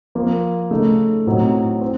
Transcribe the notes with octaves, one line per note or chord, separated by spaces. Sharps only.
F3 A#3 F4
C#3 A3 D#4
A2 F#3 C4 D#4
C4